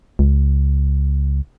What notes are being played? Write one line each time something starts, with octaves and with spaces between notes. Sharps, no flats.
C#2